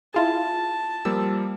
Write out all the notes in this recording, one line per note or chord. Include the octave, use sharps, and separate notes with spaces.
E4 F4 G#4 A5
F3 G3 A#3 E6